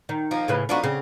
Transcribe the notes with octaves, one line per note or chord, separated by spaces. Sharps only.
D#3
F3 A#3 D#4
A2 C#3 B4
F3 B3 D4 D#4 F#4
C#3 C4